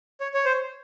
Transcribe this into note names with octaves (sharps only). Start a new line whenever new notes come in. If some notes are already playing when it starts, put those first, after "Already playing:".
C#5
C#5
C5